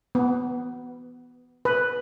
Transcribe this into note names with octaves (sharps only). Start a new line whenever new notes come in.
B3
B4